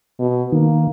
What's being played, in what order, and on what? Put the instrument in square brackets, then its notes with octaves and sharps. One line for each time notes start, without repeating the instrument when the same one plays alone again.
[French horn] B2
[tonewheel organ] D#3 [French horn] A#3